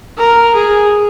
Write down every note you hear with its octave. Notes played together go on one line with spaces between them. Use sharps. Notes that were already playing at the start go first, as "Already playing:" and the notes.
A#4
G#4